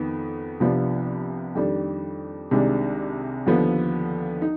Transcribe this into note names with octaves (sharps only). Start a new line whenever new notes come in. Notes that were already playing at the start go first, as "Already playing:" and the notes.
Already playing: F2 D#3 B3
C2 C3 F3 B3 D4
F2 D#3 G3 D4
C2 C3 D#3 G#3 D4
D#2 D3 F3 B3
D#4